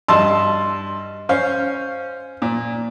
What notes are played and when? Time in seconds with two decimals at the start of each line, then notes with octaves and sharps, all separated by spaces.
0.08 G2 D#5 A5 C6 E6
1.29 C#4 C5 F5
2.42 A#2